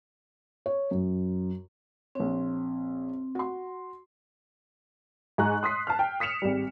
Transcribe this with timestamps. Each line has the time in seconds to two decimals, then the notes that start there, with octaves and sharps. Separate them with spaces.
0.66 C#5
0.91 F#2
2.15 A#1 C4 C#5
3.35 F#4 C6
5.38 G#2 G#5 A#5 C#6 F#6
5.63 C6 D#6 F#6 B6 C7
5.87 A5 F6
5.99 G5
6.20 D#6 B6 C#7 E7 F7
6.42 G#1 G3